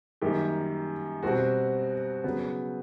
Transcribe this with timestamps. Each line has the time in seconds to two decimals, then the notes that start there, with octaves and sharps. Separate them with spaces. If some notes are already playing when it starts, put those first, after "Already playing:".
0.22 F#2 D#3 G3 A#3 G4
1.23 B2 G3 C4 F#4
2.24 C#3 F#3 B3